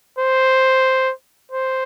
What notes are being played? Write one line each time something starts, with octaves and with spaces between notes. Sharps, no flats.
C5
C5